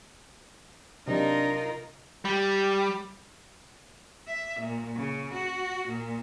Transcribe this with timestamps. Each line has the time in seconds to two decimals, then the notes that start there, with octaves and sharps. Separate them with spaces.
1.07 C3 F#3 D4 D#4 F4 A#4
2.25 G3
4.27 E5
4.60 A#2
4.96 C#3
5.33 F#4
5.88 A#2